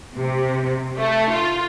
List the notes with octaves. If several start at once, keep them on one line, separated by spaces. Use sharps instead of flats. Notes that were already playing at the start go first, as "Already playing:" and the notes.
C3
A3
F4